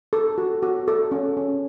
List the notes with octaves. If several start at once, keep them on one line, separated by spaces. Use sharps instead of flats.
A4
F#4
F#4
A4
C#4
C#4